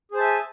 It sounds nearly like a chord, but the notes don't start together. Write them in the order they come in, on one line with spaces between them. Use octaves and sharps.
G#4 C5 A5 E5 G#5